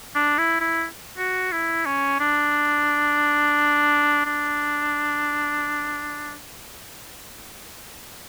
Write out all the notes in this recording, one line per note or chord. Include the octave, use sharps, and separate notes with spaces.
D4
E4
E4
F#4
E4
C#4
D4
D4